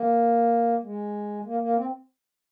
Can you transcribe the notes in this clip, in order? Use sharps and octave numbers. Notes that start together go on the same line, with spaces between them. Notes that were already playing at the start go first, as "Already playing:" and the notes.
Already playing: A#3
G#3
A#3
A#3
C4